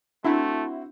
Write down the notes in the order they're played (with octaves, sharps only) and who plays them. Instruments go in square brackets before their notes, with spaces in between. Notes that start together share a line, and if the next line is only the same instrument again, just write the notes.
[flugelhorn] A3 [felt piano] C4 F#4 [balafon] D4 [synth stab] E4